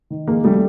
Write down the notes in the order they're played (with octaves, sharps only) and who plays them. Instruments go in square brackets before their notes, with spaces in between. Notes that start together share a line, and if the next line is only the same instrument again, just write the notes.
[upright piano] D#3
F2 G#3 A#3
C#3 G3 A3